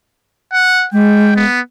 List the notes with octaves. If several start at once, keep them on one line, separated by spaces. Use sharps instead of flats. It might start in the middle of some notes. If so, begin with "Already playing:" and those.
F#5
G#3 G5
B3